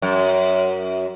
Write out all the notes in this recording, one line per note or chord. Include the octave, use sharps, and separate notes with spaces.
F#2